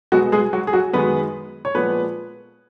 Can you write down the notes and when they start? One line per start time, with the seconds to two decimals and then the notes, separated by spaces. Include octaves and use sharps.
0.12 B2 F#3 G#3 B3 F#4
0.32 G#3 G#4
0.53 F#3 F#4
0.67 G#4
0.73 F#3 F#4
0.93 F#2 D#3 G#3 B3 B4
1.65 C#5
1.75 A#2 F3 G#3 B3 B4